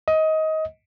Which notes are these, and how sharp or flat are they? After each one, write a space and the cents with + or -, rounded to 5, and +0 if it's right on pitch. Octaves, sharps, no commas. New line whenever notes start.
D#5 +20